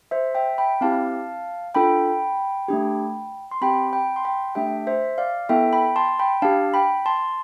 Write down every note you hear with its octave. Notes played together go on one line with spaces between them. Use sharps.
C5 E5
E5 G5
G5 B5
C4 E4 G4 F5 A5
D4 F4 A4 G5 B5
A3 D4 G4
C6
C4 G4 G5 B5
G5 B5
C6
G5 B5
A3 D4 G4 E5 G5
C5 E5
D5 F5
B3 E4 A4 E5 G5
G5 B5
A5 C6
G5 B5
D4 G4 F5 A5
G5 B5
A5 C6